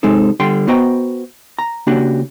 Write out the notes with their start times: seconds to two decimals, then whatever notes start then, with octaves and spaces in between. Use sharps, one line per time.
0.03 C3 G#3 C4 D#4 A4
0.40 D3 G3 G5 C6
0.68 B3 F#4 C5 D#5 G5 A#5
1.59 A#5
1.87 C#3 A#3 D4 F#4 G4